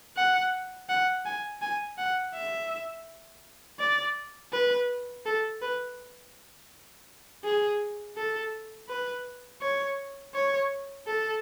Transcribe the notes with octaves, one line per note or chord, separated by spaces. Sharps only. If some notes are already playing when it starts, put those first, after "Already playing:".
F#5
F#5
G#5
G#5
F#5
E5
D5
B4
A4
B4
G#4
A4
B4
C#5
C#5
A4